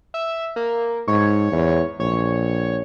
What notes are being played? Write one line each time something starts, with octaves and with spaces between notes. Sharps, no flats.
E5
A#3
G#2 C#5
E2
A#1 C#5